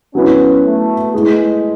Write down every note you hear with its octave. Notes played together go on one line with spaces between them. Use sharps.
F#3 B3 C#4 E4 B4
A3
G#3 A3 E4 G#4 B4